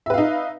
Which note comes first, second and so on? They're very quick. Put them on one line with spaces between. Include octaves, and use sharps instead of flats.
E5 B4 F5 D#4